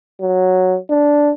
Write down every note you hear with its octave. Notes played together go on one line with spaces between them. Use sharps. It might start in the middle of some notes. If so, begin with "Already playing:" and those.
F#3
D4